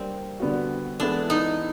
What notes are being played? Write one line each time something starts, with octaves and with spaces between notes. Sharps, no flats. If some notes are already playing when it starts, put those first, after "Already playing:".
Already playing: G3 A#3 C4 D4
D3 G3 B3 D4 F#4
E3 G#3 B3 D4 E4 A4
D#4